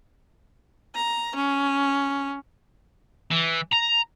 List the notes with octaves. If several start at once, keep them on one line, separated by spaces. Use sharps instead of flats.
A#5
C#4
E3
A#5